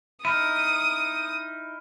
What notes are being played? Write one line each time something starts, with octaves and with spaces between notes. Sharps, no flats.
D#4 E4 D#6 F6 D#7